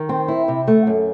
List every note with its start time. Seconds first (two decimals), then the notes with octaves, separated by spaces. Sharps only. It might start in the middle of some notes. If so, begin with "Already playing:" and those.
Already playing: D#3
0.09 C4
0.28 E4
0.48 C3
0.68 A3
0.87 F#2